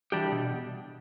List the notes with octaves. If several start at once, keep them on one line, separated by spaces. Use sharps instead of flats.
E3 G3 D4 G4
B2